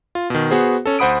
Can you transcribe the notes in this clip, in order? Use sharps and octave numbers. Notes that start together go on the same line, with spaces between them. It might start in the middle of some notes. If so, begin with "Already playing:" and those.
F4
B2 D#3
B3 F#4 G#4 C5
C#4 A4
D2 C5 F#5 B5 D#6 D7